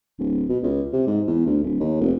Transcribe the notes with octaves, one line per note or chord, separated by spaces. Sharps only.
D1
B2
C#2
C3
G#2
E2
D2
D1
D#2
F1